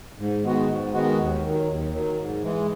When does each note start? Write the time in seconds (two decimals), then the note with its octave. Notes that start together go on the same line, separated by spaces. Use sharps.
0.18 G#2
0.43 D#3 G#3 B3 F#4
0.68 G#2
0.93 D#3 G#3 B3 F#4
1.18 D#2
1.43 D#3 F#3
1.67 D#2
1.92 D#3 F#3
2.17 G#2
2.42 E3 G#3